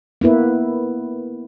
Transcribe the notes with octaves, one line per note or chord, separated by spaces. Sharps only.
A#3 B3 E4 B4